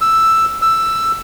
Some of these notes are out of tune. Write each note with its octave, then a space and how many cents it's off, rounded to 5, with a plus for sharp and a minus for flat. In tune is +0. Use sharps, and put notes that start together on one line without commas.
E6 +5
E6 +10